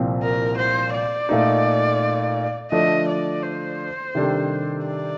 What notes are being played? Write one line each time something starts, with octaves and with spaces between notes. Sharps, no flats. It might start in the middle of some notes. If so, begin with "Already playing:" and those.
Already playing: C2 A#2 F3 C4
A#4
C5
D5
A#2 A3 D#4
D3 F3 A3 D4 A4 D#5
D5
C5
C3 D#3 G3 D4 A4
D5